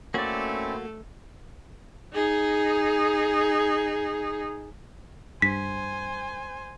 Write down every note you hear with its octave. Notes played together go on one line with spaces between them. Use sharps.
A3 A#3 C4 C#4 E4 F#4 A4 D5
D#4 G#4
G2 C5 G#5 B6